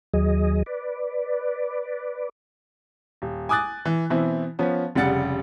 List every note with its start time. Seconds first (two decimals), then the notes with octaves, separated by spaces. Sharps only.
0.14 D#2 F#3 G#4 D#5
0.66 B4 D5
3.22 D#1
3.49 G#5 D6 D#6 F#6 A6
3.85 E3
4.10 B2 E3 C4 E4
4.59 F3 B3 C#4
4.95 F1 C#3 G3 F#5 A6 C#7